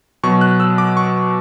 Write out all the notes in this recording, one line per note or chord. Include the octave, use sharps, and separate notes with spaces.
B2 F#3 C#6
F#6
E6
D6
C#6